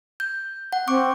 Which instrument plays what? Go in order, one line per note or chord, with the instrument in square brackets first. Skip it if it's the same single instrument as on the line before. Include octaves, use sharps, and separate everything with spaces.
[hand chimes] G6
F#5
[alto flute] C4 [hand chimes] C#6 D6